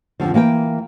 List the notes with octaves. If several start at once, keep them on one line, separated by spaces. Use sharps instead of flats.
F2 G#2 D3 F3
E3 A#3 F#5 G5